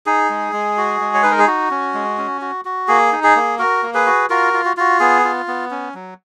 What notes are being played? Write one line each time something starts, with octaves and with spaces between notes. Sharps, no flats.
D#4 G#4
G#3
G#3
F#4
G#3
C#5
D#4 B4
A#4
G#4
F#4
C#4
G#3
C#4
F#4
F#4
A#3 G#4
D#4
G#4
A#3
F#4 A#4
A#3
G#4 B4
F#4
F4 F#4 A#4
F4
F#4
F4 F#4
B3 G#4
F4
B3
C#4
F#3